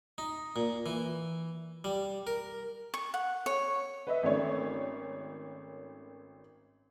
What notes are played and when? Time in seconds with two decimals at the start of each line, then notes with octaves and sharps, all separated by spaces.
0.18 D#4
0.56 A#2
0.86 E3
1.84 G3
2.27 A#4
2.94 C#6
3.14 F#5
3.46 C#5
4.07 B4 D#5 E5
4.23 G#1 A3 C#4 C#5 D5